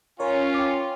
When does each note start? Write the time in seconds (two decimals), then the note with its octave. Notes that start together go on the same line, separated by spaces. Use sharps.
0.20 C#4 F4 A#4 C#5
0.54 G5 D6